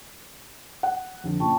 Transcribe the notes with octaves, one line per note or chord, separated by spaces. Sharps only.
F#5
F2 D3
A#2 C#3 F4 G5 A5 C#6